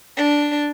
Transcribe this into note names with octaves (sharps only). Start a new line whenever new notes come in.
D4